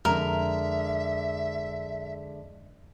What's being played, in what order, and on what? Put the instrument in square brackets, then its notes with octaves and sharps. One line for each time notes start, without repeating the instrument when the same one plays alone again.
[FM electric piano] F2 [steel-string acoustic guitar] D3 G#3 [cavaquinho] A#4 [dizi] E5